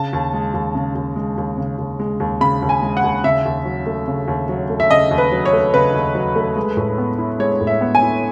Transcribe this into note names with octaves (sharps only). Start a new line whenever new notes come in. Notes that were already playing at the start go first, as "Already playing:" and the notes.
Already playing: C#3 A5
D#2
G#3
D#2
C#3
D#2
G#3
D#2
C#3
D#2
G#3
D#2
C#3 B5
D#2
G#5
G#3
F#5
D#2
C#3 E5
D#2
F#3
A3
C#3
D#2
F#3
A3
E5
C#3 D#5
D#2
B4
F#3
C#5
A3
C#3 B4
D#2
F#3
A3
G#3
A2
B3
E4
G#3 C#5
A2
E5
B3
G#5
E4